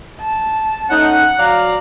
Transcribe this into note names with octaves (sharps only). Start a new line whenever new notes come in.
A5
A3 C#4 D#4 F#5
F#3 D5 F5 A#5